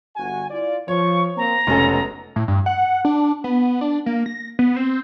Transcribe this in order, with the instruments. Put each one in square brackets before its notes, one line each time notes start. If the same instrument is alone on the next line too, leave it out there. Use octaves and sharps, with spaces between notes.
[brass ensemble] G1 F#4 G#5
E4 F4 D5
[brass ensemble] F3 [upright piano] C#5 [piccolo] C#6
[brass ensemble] A#3 C4 [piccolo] A#5
[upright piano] F1 C#4 A4 [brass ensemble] C#2 F#2 B2
[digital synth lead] A2
G2
F#5
D4
B3
D4
A#3
A#6
B3
C4